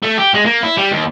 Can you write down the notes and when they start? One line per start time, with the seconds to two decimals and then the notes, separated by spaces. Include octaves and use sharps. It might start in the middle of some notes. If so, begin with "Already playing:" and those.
0.03 A3
0.18 G4
0.34 G#3
0.46 A#3
0.63 E4
0.77 G3
0.91 D#2